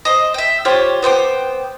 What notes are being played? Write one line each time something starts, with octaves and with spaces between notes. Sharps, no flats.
C5 D#5
E5 G5
F4 G4 C5 C#5
B3 C5 G5 D6